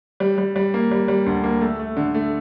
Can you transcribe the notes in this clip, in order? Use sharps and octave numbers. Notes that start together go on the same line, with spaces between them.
G3
G3
G3
A#3
G3
G3
D2
A#3
A3
A3
D3
A3